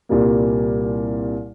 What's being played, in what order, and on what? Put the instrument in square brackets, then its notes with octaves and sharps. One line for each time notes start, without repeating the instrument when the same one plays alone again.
[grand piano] C2 A#2 G3 A#3